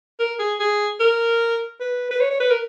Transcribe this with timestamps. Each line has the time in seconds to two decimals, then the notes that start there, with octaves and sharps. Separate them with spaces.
0.20 A#4
0.39 G#4
0.60 G#4
1.00 A#4
1.80 B4
2.11 B4
2.21 C#5
2.31 C#5
2.40 B4
2.51 A#4